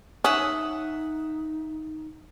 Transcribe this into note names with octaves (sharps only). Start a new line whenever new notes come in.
C#4 D#4 E5 F#5 D#6